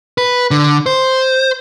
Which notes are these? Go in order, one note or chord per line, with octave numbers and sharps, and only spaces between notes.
B4
D3
C5